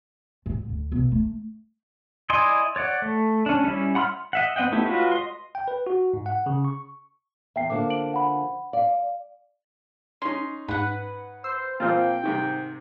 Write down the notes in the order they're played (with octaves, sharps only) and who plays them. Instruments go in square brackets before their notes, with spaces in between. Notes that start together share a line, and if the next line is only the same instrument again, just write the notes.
[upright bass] G#2
D2
B1
A3
[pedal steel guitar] E4 D5 D#5 G#5 C6
C#5 D5 F#5
A3
C#4 D4
G3 C#4 E4
F#5 B5 C6 E6 F6
D#5 E5 F#5
B3 C4 D#5 F#5 G5
A3 B3 D#4 E4 G4
G#3 F4 F#4 B4 C#5
D#5 C6
[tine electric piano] G5
B4
F#4
G#2
F#5
C#3
C#6
[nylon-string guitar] E2 [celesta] E5 G5 C7
[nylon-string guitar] D3 F3 A#3 [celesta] D6
[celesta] D7 F#7
F#5 B5
[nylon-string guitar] D5 [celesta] F5
[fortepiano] C#4 D#4 [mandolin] C6
[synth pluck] G#2 [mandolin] B4 F#5
[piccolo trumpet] C5 [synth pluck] E6 C7
[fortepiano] A#2 F3 A#3 [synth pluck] C4 F4 [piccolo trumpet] G5
[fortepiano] G#2 C3 D#3